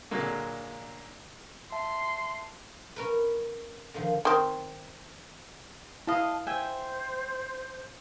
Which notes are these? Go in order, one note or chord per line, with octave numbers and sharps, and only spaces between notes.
A#2 D3 F#3 G#3 A#3
E5 A5 C6
C#4 A#4 B4
D3 D#3 F3
D#3 C4
E4 D#5 F5 A5
C5 E5 G5 G#5